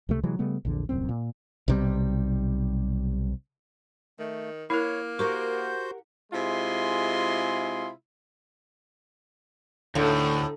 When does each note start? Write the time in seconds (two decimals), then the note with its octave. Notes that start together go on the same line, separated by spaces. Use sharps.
0.09 C#2 C3 A3
0.23 C3 E3 F#3 G#3
0.39 C#3 G3 A3 B3
0.65 A#1 E2 D3
0.89 D1 C2 F#2 C4
1.09 A#2
1.68 B1 C3 G3
4.19 D#3 A3
4.70 A#3 E4 A#4 C#5
5.19 F#4 G4 A#4 C5 F#5 C#6 G6
6.32 C3 G#3 E4 F4 G#4 C6
9.95 D2 A2 D3 D#4 A4